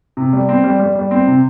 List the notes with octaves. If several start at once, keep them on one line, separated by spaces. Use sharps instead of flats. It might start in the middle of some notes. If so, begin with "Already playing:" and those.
C3
G3
C4
G3
G3
G3
C4
C3